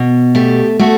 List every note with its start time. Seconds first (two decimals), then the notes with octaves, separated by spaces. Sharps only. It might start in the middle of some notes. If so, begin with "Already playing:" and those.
Already playing: B2
0.35 A3 G4
0.79 A3 F#4